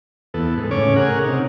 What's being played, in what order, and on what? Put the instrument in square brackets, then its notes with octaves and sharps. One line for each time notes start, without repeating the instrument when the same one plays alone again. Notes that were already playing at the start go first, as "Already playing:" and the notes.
[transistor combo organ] E2 B3 A4
G#2
A2 C#3 C#4 C#5 D6
G#4 A#4 F#5
C3 C#4 D#4